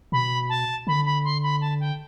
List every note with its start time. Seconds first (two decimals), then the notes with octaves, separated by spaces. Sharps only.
0.12 B2 B5
0.49 A5
0.87 D3 B5
1.05 B5
1.24 C6
1.43 B5
1.61 A5
1.80 G5